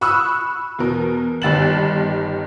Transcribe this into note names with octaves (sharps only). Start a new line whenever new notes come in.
B5 C#6 D#6 E6 F#6
E2 B2 A#4
G1 G2 D#3 A6 E7 F#7